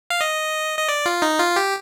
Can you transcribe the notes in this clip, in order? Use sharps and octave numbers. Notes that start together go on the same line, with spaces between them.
F5
D#5
D#5
D5
F4
D#4
F4
G4